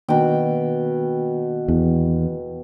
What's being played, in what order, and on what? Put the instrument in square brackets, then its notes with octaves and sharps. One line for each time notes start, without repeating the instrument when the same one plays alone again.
[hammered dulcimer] B2 G5 [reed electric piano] D#3 A#3 D4
[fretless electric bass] E2